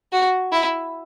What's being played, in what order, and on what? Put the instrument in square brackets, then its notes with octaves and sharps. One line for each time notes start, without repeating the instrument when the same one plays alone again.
[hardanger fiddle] F#4
E4